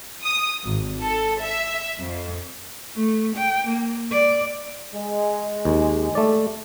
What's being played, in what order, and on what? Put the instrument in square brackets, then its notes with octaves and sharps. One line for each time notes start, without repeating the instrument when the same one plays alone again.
[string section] D#6
G#1
A4
E5
F2
[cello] A3
G5
A#3
D5
[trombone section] G#3
[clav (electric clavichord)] D#2
A3 D5